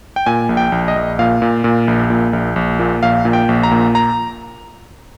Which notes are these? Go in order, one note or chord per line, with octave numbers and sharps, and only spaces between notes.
G5
A#2 G#5
A#1
G5
A#1
D#5
A#1
A#2 F5
A#2
A#2
A#1
A#2
A#1
A#1
A#2
A#1 F5
A#2
G5
A#1
A#5
A#2
A#5